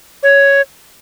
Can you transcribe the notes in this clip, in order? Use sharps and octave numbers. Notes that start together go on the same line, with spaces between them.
C#5